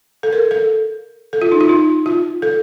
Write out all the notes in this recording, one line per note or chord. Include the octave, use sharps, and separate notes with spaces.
A4
A#4
A4
A4
F4
D#4
F4
D#4
F4
A4